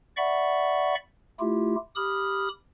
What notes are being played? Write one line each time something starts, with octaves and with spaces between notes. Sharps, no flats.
D5 E5 F#5 B5 C#6
A3 E4 F4 G4
G4 B5 D#6 F6